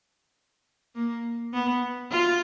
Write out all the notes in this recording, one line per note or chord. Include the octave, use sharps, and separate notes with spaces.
A#3
B3
F4